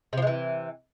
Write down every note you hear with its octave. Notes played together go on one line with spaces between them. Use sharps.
C3 E3 F3 G#3